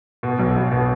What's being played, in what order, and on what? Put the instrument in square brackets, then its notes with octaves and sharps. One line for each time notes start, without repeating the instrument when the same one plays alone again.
[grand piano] B2
B1
B1
B2